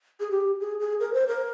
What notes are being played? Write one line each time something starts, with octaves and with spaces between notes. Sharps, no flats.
G#4
G4
G#4
G#4
A#4
C5
A#4